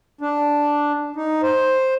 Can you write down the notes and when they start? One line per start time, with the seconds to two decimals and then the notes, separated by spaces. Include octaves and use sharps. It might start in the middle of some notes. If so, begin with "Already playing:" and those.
0.21 D4
1.16 D#4
1.43 C5